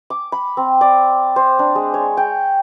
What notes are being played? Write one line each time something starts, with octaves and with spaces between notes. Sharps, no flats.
D6
B5
C4
D5
C5
D4
G#3
C#5
G5